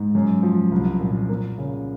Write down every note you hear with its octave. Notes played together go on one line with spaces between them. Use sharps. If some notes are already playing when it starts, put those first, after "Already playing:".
Already playing: G#2
F#2
F3
C2
A#2
A#3
C#3